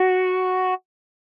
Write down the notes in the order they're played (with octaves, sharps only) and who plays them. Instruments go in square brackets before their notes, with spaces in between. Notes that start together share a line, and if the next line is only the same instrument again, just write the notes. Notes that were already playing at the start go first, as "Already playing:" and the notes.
Already playing: [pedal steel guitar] F#4